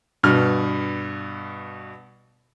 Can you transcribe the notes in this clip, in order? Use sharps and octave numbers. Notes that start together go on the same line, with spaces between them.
G2 B2 F6